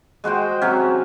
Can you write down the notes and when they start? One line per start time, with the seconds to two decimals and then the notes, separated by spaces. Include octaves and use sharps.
0.24 G#3 F#4 C5 G5
0.62 C3 F#3 C#4